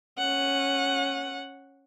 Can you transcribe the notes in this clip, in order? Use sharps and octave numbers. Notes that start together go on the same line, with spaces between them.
C#4 F#5